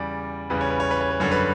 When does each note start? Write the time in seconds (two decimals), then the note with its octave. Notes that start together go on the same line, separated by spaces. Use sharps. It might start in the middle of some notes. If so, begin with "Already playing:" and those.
Already playing: E2 C#3 G3 D5
0.50 E2 C#3 G3 B4
0.61 C#5
0.71 B4
0.80 C#5
0.91 B4
1.01 C#5
1.11 B4
1.20 F#2 D3 G3 C#5
1.31 B4